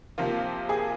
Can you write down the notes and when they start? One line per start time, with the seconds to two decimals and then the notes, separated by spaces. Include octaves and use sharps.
0.18 C3 F3 A#3 F4
0.69 G#4